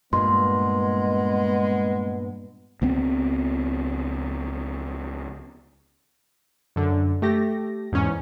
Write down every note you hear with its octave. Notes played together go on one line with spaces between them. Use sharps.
G2 A#2 G#3 B3 C6
C#2 B3 C4
F#2 D3
A3 G4 A#6
E2 G#2 C#4